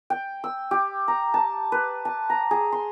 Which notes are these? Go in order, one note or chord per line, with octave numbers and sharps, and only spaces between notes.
G5
E6
G4
A#5
A5
B4
A5
A#5
G#4
C6